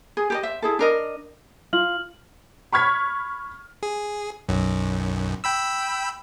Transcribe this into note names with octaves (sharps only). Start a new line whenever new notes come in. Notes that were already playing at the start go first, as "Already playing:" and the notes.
G#4
G4 A4 D#5
C5 E5
E4 G#4 A4
D4 A#4 D#5
F4 F6 F#7
B5 C#6 F6 G#6 B6
G#4
B1 F#2
G5 B5 E6